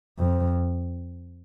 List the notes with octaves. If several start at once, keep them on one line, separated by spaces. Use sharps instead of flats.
F2